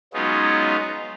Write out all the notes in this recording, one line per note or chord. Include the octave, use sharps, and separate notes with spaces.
F#3 G#3 B3 C#4 D#4 F4